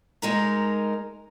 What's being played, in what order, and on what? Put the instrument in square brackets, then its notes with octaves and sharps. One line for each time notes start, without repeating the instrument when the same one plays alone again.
[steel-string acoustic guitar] G#3 D#4 A#4